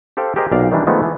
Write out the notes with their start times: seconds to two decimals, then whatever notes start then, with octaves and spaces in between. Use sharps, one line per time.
0.17 G4 A4 C5 F5 G5
0.36 G4 G#4 A#4 C5 D#5
0.52 B1 A#2 D5 F5
0.72 D#3 E3 G3 D4
0.87 D#3 F3 G#3 A3 B3
1.03 E3